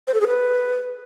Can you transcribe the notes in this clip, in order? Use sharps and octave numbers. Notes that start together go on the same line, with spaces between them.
C5
A4
G#4
B4